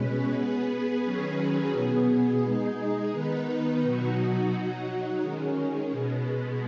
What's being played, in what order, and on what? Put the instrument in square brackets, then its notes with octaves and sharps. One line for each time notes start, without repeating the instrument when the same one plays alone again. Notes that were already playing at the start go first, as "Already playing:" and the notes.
Already playing: [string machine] B2 G#3 C#4 B4
B3 G#4 B4
D#3 F#3 C#4 G#4 B4
B2 B3 G#4
G#3 D#4 G#4
D#3 B3 D#4 B4
B2 F#3 D#4 F#4
F#3 D#4 F#4
D#3 G#3 C#4
B2 G#3 B3